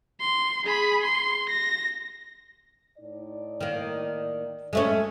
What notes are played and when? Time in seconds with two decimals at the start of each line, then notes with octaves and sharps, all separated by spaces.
0.21 C6
0.64 G#4 B5
1.04 C6
1.49 A#6
2.98 A2 D#4 D5
3.61 D#3 A#3
4.73 G#3 A3 C#4